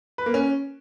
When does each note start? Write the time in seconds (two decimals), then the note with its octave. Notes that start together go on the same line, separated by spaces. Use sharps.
0.18 B4
0.26 A#3
0.34 C#4